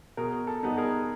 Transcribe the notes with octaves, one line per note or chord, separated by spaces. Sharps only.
B2 G#4 A#4
A4
G3 B3 D#4
G#4 A#4